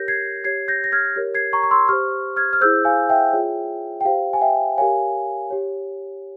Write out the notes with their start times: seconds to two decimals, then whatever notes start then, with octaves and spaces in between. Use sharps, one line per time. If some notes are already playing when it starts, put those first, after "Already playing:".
Already playing: G4 A#4 C#5 G6 A#6
0.08 G#6 C7
0.44 G4 C#5 G#6 C7
0.68 G6 A#6
0.84 A#6
0.92 F6 G#6
1.16 G4 A#4 C#5
1.35 G#6 C7
1.53 A#5 C#6
1.63 C#6
1.71 C6 E6
1.88 G4 C5 C#6 F6
2.36 F6 G#6
2.53 F6
2.61 E4 G#4 C5 E6 G6
2.85 F5 G#5
3.10 E5 G5
3.33 F4 G#4 C#5
4.01 G5
4.05 G4 C5 F5
4.33 G#5
4.42 E5 G5
4.78 G4 A#4 C#5 F5 G#5
5.51 G4 C#5